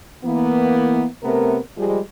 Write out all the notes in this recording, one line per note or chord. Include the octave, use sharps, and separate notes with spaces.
E3 A#3 B3
C3 A3 B3 C4 A#4
F3 G3 G#3